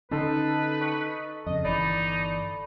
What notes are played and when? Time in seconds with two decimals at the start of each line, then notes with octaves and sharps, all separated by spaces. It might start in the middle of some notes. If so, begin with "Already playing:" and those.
0.11 D3 C#4 D#4 A4 B4 C6
0.81 C#6
1.46 F2 C#3 D#5
1.64 G1 E3 D#4 B4 D5